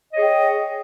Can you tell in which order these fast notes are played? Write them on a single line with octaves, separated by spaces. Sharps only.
D#5 C#5 G#4 G5